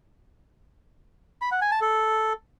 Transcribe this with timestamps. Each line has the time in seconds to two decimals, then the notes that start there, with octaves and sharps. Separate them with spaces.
1.42 B5
1.52 F#5
1.61 G#5
1.71 A5
1.81 A4